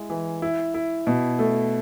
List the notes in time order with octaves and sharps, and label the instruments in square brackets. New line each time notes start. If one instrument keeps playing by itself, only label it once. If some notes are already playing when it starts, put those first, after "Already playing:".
Already playing: [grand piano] G#3 E4
E3
E4
E4
B2
A3